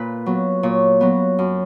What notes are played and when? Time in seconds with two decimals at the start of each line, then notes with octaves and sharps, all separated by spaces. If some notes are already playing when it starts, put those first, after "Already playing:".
Already playing: A#2 B4
0.26 F#3 B3
0.63 A#2 C#5
1.01 F#3 B3
1.39 F#2